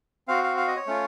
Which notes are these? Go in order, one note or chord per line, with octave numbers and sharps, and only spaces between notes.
C4 F#4 F5
F5
F5
D#5
C#5
A3 C#4 F4